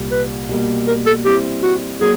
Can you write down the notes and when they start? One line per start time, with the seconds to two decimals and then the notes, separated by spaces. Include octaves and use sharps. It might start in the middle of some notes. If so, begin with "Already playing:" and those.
Already playing: C2 A#2 G3 A#3
0.11 B4
0.49 B2 G3 A#3
0.88 A#4
1.06 A4
1.25 G3 C4 E4 G4
1.63 F#4
2.01 F#3 A#3 G#4